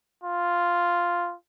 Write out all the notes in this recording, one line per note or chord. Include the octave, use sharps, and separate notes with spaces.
F4